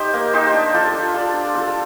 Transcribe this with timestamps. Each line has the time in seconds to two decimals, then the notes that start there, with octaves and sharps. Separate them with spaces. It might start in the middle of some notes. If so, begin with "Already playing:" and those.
Already playing: D#4 G4 C5
0.13 A#3
0.33 D#4 G4 C5
0.54 D4
0.74 F4 A4 D5
0.93 D4
1.14 F4 A4 D5
1.33 D4
1.54 F4 A4 D5